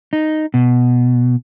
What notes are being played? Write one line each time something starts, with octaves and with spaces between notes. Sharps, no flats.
D#4
B2